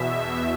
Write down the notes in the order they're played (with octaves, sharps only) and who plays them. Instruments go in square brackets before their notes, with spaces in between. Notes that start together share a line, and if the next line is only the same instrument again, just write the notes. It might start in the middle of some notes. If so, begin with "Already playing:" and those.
Already playing: [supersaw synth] E2 B2 E5